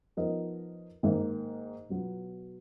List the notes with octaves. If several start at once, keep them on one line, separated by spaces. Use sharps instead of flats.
F3 B3 D#4 A#4 D#5
G#2 D#3 A#3
B2 F#3 B3 F4